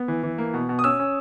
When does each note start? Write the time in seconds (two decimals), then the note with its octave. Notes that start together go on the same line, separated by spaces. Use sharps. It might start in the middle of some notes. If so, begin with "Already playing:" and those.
Already playing: B3
0.08 E3
0.23 E3
0.38 A#3
0.54 B2
0.69 B2
0.79 D#6
0.84 C#4 E6
0.99 C#4